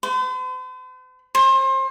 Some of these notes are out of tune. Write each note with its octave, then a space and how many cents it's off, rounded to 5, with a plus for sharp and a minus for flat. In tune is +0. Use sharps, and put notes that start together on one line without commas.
C5 -45
C5 +30